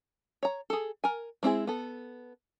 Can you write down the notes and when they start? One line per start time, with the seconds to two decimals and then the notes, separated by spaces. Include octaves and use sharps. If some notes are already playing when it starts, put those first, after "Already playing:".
0.43 C#5 A#5
0.70 G#4 A4
1.04 A#4 G#5
1.43 G#3 C4 E4 G#4
1.67 B3 A4